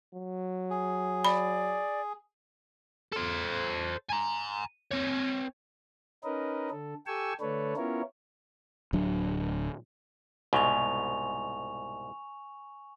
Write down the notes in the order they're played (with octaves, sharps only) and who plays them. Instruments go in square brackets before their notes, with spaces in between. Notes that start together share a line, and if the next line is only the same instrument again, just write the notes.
[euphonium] F#3
[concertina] G#4
[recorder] D5 [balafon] B5
[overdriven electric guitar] A4 C5
G#5 A#5
C4 C#5
[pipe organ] C#4 D#4 A#4 B4 D#5
D3 A4
G4 A4 G5 G#5 C#6 E6
D3 A3 D4 A4 B4 C#5
B3 C#4 E4 F4 A#4 C#5
[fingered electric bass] D1 F#3 D4
[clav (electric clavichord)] C2 G#2 B2 [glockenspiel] G#5 C#6 F7